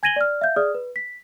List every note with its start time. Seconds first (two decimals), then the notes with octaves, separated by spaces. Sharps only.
0.03 G#5 G#6 A#6 D#7 F#7 G7
0.16 D5 F6
0.41 E5 F5 G6
0.56 G#4 D5 D#6 F6
0.75 B4
0.96 B6